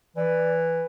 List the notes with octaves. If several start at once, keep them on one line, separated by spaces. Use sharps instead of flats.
E3 D5